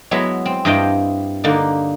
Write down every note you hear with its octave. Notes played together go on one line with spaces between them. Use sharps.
F#3 G#3 B3 E4 E5
C4
G2 E4 C5 D#5 F5 G5
D3 A#3 D#4